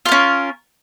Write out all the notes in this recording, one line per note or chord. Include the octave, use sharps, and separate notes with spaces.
C#4 F4 A#4